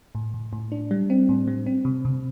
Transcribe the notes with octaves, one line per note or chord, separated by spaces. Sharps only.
A2
A2
A2
D4
G3
C4
A2
G3
C4
C3
C3